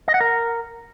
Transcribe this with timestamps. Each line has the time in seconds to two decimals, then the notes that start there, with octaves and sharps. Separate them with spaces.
0.08 D#5
0.14 F#5
0.20 A#4